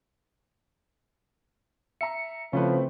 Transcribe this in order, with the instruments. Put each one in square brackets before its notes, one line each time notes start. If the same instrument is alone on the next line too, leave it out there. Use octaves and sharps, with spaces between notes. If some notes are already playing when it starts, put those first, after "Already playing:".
[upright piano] E5 A#5 [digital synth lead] C#7
[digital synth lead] C#3 [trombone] F3 [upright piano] A3 E4 B4 [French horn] C4